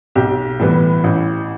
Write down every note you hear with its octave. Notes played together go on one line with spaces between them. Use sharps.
B1 G4
A2 E3 G3 B3
A1